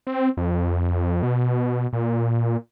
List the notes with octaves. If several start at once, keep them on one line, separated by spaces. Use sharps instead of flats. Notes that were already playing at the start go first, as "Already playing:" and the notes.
C4
F2
B2
A#2